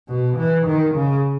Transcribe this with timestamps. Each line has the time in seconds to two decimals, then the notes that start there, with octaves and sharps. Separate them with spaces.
0.09 B2
0.37 E3
0.67 D#3
0.95 C#3